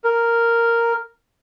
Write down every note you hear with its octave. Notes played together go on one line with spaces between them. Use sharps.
A#4